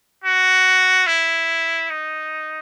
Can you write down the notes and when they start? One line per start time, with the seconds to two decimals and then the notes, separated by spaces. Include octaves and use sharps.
0.24 F#4
1.07 E4
1.90 D#4